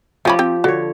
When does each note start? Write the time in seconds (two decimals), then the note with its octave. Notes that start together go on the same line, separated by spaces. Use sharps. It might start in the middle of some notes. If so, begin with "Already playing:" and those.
0.25 F3 A3 C#4 G4 B5
0.39 C4 G5
0.64 D3 F#4 C#5